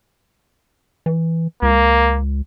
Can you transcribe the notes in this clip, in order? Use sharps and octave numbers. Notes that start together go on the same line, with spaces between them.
E3
C#2 A#3